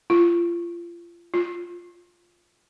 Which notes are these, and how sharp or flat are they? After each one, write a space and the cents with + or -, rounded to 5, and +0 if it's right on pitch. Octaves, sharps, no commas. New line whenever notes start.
F4 -30
F4 +5